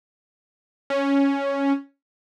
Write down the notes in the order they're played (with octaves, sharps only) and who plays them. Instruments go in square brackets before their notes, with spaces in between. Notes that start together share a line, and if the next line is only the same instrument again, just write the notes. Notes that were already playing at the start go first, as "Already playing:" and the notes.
[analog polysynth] C#4